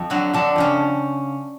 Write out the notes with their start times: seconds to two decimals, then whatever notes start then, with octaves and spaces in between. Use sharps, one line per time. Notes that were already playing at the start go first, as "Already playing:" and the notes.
Already playing: F2
0.10 D3 F#3 F#4
0.33 F2 D3 D4
0.56 F2 C#3 C#4